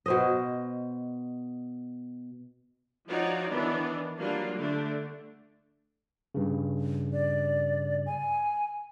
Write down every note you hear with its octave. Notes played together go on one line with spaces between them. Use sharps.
B2 C5 D#5
F3 D#4 F4 F#4 C#5 D5
D#3 E3 B3 D4
F#3 G3 A#3 D4 F4
D3 A3 D4
G2 C#3
D5
G#5